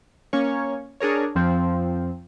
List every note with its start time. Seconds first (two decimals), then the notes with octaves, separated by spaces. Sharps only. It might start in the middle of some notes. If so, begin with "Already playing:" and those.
0.33 A#3 C#4 C#5
1.00 D4 G#4 A#4 C#5
1.35 F2 F3 C4